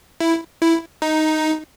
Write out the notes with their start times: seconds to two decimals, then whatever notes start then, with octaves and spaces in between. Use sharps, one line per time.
0.20 E4
0.61 E4
1.02 D#4